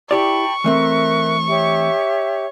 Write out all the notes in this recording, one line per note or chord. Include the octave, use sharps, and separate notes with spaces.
E4 G4 D5 G5 A5 B5 C#6
E3 A3 C4 A#4 E5 F#6
G4 C#5 E5